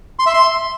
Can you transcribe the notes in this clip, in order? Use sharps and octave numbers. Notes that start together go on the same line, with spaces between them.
C6
E5
C6